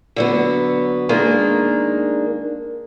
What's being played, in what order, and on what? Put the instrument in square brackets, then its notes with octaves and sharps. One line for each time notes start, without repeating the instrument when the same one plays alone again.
[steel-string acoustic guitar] D3 F#3 B3
D#3 G#3 A#3 D4